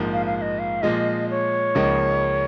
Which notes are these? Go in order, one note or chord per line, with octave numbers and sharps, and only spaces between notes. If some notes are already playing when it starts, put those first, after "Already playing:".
Already playing: A#1 G#2 F3 A#3
F5
F5
F5
D#5
F5
A#2 F3 G#3 F4 D#5
C#5
C#2 C#3 F3 A#3 D#4